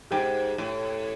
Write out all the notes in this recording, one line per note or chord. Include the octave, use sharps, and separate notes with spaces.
G#2 G4 G5
A2